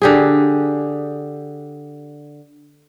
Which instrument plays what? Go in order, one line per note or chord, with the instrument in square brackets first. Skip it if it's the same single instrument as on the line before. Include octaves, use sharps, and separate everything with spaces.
[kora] D3 G4 G#4